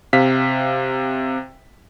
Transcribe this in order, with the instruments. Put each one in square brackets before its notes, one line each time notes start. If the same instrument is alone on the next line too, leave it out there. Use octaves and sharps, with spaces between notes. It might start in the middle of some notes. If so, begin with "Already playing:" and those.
[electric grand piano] C3 F5 B6